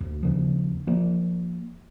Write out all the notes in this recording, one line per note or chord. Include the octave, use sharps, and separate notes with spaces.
D2
D#2 C#3 F3
F3 A#3